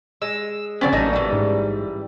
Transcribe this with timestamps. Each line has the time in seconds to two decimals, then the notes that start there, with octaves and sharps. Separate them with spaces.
0.22 G#3 E6
0.81 C#3 F#3 C4 C#4 D5
0.92 A1 F#3 A3 A#3 D#4
1.13 E3 G3
1.32 G#2